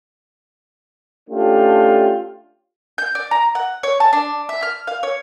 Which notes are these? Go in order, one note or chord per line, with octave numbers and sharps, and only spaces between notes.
A3 C#4 D4 F4 G4
G6
D5
A#5
F#5
C#5
A5
D4
E5
F6
F5
C#5